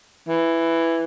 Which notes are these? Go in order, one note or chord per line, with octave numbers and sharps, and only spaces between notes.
E3